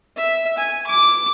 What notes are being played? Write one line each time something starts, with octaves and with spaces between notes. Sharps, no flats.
E5
G#5
D6